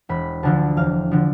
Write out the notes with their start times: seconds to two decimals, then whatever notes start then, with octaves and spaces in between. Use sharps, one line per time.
0.09 E1 B5
0.43 D2 D3 F3 A5
0.77 E1 F5
1.11 D3 F3